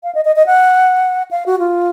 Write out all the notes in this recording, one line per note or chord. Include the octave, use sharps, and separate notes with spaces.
F5
D#5
D#5
D#5
F#5
F5
F#4
F4